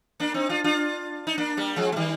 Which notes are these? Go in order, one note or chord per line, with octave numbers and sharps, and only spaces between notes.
A#3 D4
C4 D#4
D4 F4
D4 F4
D#4
A#3 D4
G3 A#3
F3 G#3
G#3
D#3 G3